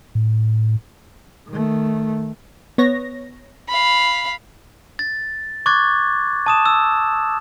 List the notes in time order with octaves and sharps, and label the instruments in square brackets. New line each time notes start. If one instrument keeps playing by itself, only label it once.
[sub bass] A2
[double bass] D#3 A3
[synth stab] B3 C#5 A#6
[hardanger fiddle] F5 B5
[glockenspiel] A6
C#6 D6 F#6 G#6 A6
A5 D#6 E7
E6